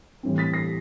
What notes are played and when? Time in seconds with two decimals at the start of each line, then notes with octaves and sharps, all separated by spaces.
0.23 A2 E3 G3 C4
0.38 A6 B6
0.54 A#6 C7